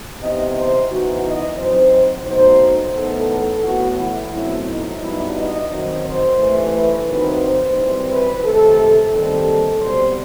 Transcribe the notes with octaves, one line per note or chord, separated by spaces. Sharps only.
C3 E3 B3 D#4 D#5
C5
F#2 E3 B3 D#4 F#4
D#5
F#2 F#3 C4 D#4 C5
B2 F#3 A3 D#4 C5
A2 E3 B3 D#4 A4
A4
A2 E3 B3 F#4
E4
B2 F#3 A3 C4 E4
D#4
G2 F#3 B3 D#4 E4
D#5
F#2 D#3 F#3 C4 D#4
C5
G2 E3 A3
B4
D#2 D#3 F#3 C4 D#4 B4
C5
F#2 E3 G3 C4
B4
C3 D#3 A3 A4
D#2 D#3 G3 C4 A4
B2 G3 C4 C5